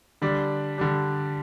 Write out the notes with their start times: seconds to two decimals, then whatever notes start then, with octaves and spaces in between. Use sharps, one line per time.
0.22 D3 G3 D4
0.78 D3 G3 D4